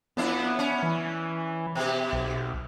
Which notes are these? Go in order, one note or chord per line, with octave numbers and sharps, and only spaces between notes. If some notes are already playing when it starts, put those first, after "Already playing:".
F2 B3 D4 E4
C#4
E3
B2 G4
B1